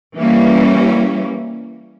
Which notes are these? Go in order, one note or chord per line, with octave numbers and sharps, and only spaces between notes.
E3 G3 A#3 C#4